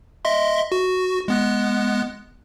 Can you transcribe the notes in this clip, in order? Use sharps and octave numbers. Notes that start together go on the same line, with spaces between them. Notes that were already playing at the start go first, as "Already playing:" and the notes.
D#5 E5 C6
F#4
G#3 B3 F#6